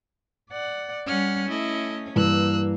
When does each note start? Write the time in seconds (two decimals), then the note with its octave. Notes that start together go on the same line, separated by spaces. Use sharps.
0.51 D5 F#5
1.07 G3 C#4 F#5 F6
1.49 A3 C#4 E4 D#5
2.16 G2 E3 A#3 E6 F#6